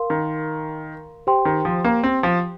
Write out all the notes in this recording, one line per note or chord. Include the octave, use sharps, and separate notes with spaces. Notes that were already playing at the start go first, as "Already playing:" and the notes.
Already playing: A#4 F5 C6
D#3
G4 C5 G5 C6
D#3
F3
A#3
C4
F3